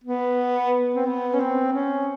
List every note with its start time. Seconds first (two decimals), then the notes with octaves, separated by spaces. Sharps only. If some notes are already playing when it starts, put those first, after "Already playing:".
0.04 B3
0.95 C4
1.06 B3
1.34 C#4
1.40 C4
1.73 C#4